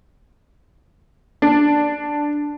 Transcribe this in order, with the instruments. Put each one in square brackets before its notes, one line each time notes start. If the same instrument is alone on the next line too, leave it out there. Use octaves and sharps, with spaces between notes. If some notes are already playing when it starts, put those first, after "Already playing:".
[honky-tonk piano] D4